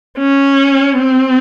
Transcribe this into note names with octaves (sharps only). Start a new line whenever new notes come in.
C#4
C4